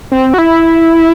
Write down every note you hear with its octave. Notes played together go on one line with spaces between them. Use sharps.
C4
F#4
E4